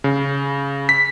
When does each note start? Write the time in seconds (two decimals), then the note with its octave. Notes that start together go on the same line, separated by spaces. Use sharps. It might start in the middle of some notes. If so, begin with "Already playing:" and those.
0.04 C#3
0.89 B6